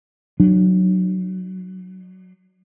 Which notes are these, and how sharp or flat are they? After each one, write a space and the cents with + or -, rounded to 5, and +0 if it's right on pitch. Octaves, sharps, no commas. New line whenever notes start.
F#3 +0 D4 +45